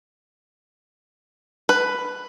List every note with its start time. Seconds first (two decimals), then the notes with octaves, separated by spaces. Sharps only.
1.69 B4